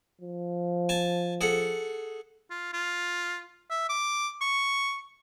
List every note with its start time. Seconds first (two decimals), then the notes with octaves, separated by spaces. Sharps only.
0.21 F3
0.89 G#5 A5
1.41 G#4 A4 F#5
2.50 F4
2.73 F4
3.70 E5
3.89 D6
4.41 C#6